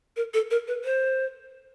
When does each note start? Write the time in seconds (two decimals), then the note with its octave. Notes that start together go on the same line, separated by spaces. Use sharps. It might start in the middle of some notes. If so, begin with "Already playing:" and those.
0.16 A#4
0.34 A4
0.51 A#4
0.67 B4
0.85 C5